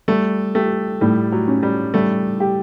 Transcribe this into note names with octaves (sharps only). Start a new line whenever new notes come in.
G3 A3
A3 G4
A2 G3
F#3
C#4
G3
G3 A3
G4